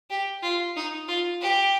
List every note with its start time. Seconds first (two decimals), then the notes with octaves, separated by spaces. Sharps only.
0.10 G4
0.42 F4
0.76 D#4
1.08 F4
1.41 G4